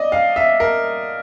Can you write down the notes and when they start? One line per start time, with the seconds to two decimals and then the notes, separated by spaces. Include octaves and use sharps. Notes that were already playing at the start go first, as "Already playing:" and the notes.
Already playing: D5 D#5
0.12 F5
0.36 E5
0.60 A#4